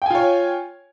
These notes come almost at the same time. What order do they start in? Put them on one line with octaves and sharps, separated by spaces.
G5 G#5 F4 C#5